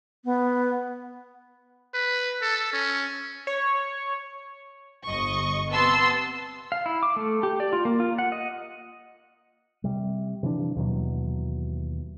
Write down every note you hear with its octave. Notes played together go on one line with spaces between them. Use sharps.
B3
B4
A4
C#4
C#5
G1 D#5 C#6
C3 B3 A5 C6 E6
F5
E4
D6
A3
G4
D5
F4
A#3
F4
F#5
D#5
C3 G3
C3 E3 F3 D4
D#2 B2 E3 F#3